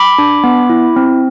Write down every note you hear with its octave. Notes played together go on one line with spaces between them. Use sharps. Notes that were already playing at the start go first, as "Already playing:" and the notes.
Already playing: B5 D6
D4
B3
E4
C4